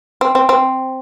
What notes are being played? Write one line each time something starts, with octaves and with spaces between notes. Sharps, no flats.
C4
C4
C4